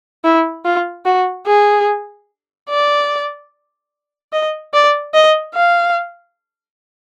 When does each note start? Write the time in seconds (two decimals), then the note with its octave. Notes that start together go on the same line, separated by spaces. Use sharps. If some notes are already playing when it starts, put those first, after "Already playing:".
0.24 E4
0.65 F4
1.05 F#4
1.47 G#4
2.69 D5
4.32 D#5
4.74 D5
5.14 D#5
5.55 F5